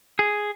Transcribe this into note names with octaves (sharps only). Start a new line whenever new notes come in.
G#4